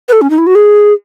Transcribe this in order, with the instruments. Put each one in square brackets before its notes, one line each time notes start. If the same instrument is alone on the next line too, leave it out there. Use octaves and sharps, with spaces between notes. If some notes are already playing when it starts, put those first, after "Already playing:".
[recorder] B4
A4
C#4
D#4
E4
F#4
G#4